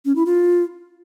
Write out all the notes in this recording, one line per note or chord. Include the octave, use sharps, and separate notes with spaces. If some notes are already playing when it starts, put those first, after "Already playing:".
C#4
E4
F4